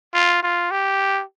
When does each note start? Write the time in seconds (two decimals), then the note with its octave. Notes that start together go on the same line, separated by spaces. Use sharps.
0.14 F4
0.43 F4
0.71 G4